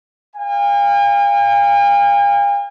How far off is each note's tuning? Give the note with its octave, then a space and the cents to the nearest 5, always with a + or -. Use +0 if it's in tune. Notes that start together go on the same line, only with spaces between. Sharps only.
F5 +0 G#5 -45